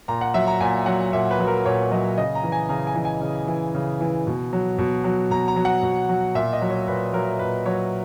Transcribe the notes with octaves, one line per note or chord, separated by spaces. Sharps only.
A#2 A#5
F#5
F#3 E5
A#5
A#2 G#5
F#3 F#5
A#2 E5
B4
F#3
A#4
A#2 C#5
F#3 D#5
C#3 D#5
A#5
E3
G#5
C#3 A#5
G#5
E3
G#5
C#3
E3
C#3
E3
B2
F#3
B2
F#3
B2 A#5
A#5
F#3
F#5
B2
F#3
A#2 E5
D#5
F#3
C#5
A#2 B4
F#3 A#4
A#2 B4
F#3 C#5